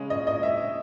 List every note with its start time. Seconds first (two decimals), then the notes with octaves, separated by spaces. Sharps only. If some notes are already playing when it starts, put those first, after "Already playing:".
Already playing: C#3 G#3 C#4
0.10 D#5
0.27 D#5
0.43 E5